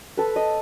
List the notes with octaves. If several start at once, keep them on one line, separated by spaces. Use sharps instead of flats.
A4 B4
D#5